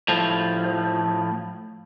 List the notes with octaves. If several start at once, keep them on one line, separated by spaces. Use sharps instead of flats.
A2 F3